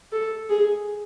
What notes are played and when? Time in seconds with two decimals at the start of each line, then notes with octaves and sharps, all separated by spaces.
0.12 A4
0.50 G#4